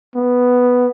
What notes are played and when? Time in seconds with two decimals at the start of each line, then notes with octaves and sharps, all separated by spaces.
0.16 B3